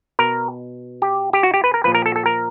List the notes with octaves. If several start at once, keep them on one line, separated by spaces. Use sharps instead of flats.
B2 A#4
G4
G4
F#4
G4
B4
A#4
A#2 F3 B4
A#4
A4
A4
A#4